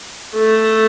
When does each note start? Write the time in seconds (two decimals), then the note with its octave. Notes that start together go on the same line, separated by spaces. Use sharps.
0.35 A3